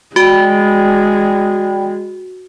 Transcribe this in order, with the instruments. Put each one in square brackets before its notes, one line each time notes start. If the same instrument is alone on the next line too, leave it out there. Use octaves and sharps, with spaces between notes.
[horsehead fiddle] G#3 [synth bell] F#4 [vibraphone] D5 G5 B5